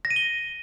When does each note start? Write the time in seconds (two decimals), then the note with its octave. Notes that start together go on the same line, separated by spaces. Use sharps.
0.05 A#6
0.10 D#7
0.16 G7